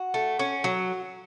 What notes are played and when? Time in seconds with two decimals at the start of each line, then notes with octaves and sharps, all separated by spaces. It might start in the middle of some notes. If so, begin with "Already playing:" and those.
Already playing: F#4
0.14 A3
0.39 C#4
0.64 F#3